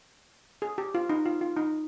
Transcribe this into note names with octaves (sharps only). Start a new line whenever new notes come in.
G#4
G4
F4
D#4
F4
F4
D#4